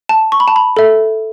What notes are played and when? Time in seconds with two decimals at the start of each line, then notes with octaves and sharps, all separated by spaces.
0.09 A5
0.32 C#6
0.40 B5
0.48 A5
0.56 B5
0.77 A4 E5